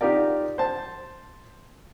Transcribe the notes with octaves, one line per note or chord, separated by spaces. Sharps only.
D#4 F4 G4 A#4 D5
C5 A5